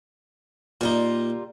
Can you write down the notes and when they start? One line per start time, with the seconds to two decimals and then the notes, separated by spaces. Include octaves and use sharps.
0.81 A#2 G3 D#4 F4 A#4